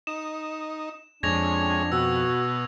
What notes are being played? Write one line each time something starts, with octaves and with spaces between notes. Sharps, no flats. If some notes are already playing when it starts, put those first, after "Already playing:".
D#4 E7
F2 G#3 C#4 D4 G#6 A#6 F7
B2 F#4 E6